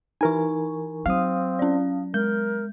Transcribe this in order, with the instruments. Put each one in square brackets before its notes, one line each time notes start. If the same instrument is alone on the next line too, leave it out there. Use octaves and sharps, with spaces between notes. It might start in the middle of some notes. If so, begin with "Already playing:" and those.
[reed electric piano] E3 A#4 G#5 [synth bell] D#4 C#6
[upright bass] F#3 [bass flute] C4 [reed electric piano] F5 D#6
[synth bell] C#4 D5
[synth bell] G#3 [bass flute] A#4 [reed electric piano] G6